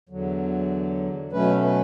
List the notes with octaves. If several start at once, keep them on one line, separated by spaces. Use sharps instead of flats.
E2 D3 F#3
B2 F#3 A3 C#4 B4
B4